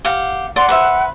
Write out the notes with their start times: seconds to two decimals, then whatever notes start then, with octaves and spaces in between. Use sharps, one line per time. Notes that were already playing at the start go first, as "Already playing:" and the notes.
0.05 G4 F5 F#5
0.56 D5 F#5 C6
0.69 B4 C5 E5